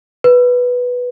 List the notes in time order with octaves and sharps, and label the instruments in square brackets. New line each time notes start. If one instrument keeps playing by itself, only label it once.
[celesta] B4